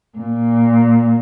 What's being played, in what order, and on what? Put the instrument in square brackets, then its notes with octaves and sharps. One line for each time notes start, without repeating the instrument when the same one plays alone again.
[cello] A#2